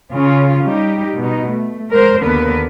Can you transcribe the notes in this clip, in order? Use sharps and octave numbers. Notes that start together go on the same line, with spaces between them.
C#3 C#4 F4
G3 D#4 G4
B2 D#4
A3
G#3 A#4 C5
D#2 D3 A#3 B3 A#4 B4